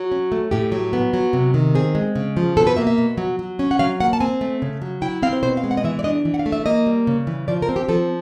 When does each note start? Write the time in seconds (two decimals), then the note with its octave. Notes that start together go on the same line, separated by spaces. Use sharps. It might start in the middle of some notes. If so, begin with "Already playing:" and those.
Already playing: F#3
0.12 C#4
0.32 A3
0.51 A2 G4
0.72 F#3
0.93 B3
1.13 F#3
1.33 C3
1.54 D#3
1.75 C4 G#4
1.95 G#3
2.16 C#3
2.37 F3
2.57 B2 A4
2.67 B4
2.77 A#3 E5
2.87 E5
2.98 B2
3.18 F#3
3.39 F#3
3.59 C#4
3.71 F#5
3.79 F#3 F5
4.00 A#3 F#5
4.13 A5
4.21 C4 G#5
4.41 A3
4.62 C#3
4.82 F#3
5.02 E4 G5
5.22 C4 F5
5.33 C5
5.43 B2 C5
5.57 F5
5.64 G#3
5.71 F#5
5.77 D#5
5.84 E3 E5
5.99 D5
6.04 D4 D#5
6.25 E3
6.34 F#5
6.39 F5
6.46 A3
6.52 E5
6.66 A#3 D#5
6.87 G3
7.07 C#3
7.27 E3
7.48 F3 D5
7.62 A#4
7.69 C4
7.76 G4
7.89 F3 A4